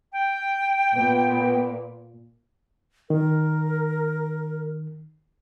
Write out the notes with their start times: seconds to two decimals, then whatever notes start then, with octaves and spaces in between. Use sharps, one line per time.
0.12 G5
0.95 A#2 B3 B4
3.10 D#3 A#4